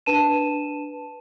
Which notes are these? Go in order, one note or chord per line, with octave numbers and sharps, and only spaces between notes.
D4 B4 A5 D#7 E7